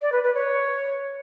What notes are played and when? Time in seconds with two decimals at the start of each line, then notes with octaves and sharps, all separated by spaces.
0.01 D5
0.12 B4
0.23 B4
0.34 C#5